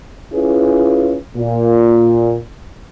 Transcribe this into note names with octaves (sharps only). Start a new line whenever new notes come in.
C#4 E4 F4 G#4 B4
A#2